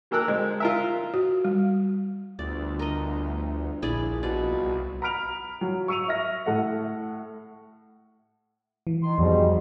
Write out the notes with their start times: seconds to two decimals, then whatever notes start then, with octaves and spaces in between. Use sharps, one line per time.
0.11 F#3 A#3 A4 A#4 E6 F#6
0.28 G#3 C4
0.60 F4 A#4 E5
1.14 F#4
1.45 G3
2.39 G1 D2 D5
2.79 A#4 D#5
3.82 A#1 E4 G#4 D5
4.23 B2 F4 D5
4.52 C2
5.02 A#5 B5 F6 D7 F7
5.61 F#3
5.88 C#6 E6 C#7 D#7 F7
6.08 E5 F6 A#6
6.46 A2 A4 F#5
8.87 E3
9.03 D#3 C6
9.18 F2 G#2 B2 G3